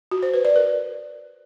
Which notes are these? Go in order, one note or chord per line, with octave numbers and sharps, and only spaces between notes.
F#4
C5
B4
D5
A#4